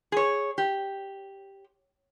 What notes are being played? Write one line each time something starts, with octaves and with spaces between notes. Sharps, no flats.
G#4 C#5
G4